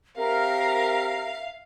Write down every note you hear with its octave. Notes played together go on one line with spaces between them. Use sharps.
C4 G4 A#4 E5 F5